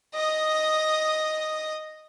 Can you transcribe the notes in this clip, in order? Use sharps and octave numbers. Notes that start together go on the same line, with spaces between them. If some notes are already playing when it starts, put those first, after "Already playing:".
D#5 D#6